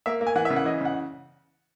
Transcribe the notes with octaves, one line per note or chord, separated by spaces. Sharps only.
A#3 E5
A#3
G#5
E3 F#5
E5
C#3
F#5
E3 D#5
C#3 F#5